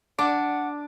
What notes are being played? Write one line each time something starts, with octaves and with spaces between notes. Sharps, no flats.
D4 F#5 D6